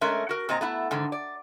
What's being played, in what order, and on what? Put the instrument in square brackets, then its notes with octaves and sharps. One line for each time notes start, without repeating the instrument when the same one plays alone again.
[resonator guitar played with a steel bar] G#3 A3 C#4 A#4 E5
F#4 A#4
A#2 C4 D#5 A#5
A3 B3 E4
G#2 D3 D#3
D5